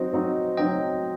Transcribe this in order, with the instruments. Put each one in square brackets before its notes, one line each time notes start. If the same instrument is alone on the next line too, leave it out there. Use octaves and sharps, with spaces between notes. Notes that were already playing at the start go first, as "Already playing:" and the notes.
Already playing: [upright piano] F#3 C4 D#4 F#4 [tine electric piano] C5 D#5
[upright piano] F#3 C4 D#4 F#4
[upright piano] F#3 C4 D#4 F#4 [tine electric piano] D#5 G5